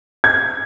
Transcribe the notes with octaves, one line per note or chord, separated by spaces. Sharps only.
G#6